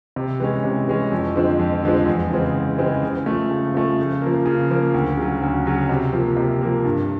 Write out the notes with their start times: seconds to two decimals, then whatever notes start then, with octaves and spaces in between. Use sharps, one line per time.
0.16 C3
0.40 E3 G#3 C#4
0.64 C3
0.87 E3 G#3 C#4
1.11 F2
1.35 D3 F3 G#3 C4
1.59 F2
1.83 D3 F3 G#3 C4
2.07 E2
2.30 C#3 E3 G#3 C4
2.54 E2
2.78 C#3 E3 G#3 C4
3.03 C#3
3.26 F3 A3
3.51 C#3
3.74 F3 A3
3.98 C#3
4.22 F3 A#3
4.46 C#3
4.71 F3 A#3
4.94 D2
5.17 C#3 F#3
5.42 D2
5.66 C#3 F#3
5.89 C3
6.13 F3 A#3
6.37 C3
6.62 F3 A#3
6.85 G2